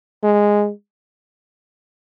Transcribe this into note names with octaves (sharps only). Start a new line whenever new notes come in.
G#3